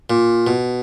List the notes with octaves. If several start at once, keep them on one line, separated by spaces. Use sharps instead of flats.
A#2
B2